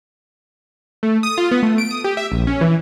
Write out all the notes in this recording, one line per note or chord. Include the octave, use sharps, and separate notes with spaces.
A3
D#6
F4
B3
A3
D7
D#6
G4
E5
A#1
C#4
E3